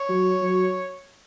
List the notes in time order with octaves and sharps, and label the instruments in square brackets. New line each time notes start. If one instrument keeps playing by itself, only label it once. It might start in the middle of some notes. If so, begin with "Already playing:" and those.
Already playing: [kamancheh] C#5
[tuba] F#3
F#3